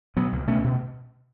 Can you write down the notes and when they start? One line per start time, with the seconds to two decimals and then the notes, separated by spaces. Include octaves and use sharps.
0.16 B2 F#3 B3
0.32 C#2
0.48 B2 A3 C#4
0.64 B2